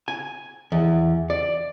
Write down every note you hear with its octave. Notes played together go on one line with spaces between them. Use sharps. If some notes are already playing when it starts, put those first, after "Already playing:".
G#5
E2
D5